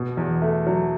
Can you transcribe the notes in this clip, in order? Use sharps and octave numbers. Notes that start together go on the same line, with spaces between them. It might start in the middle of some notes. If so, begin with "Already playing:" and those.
Already playing: B2
E2
A3
F#3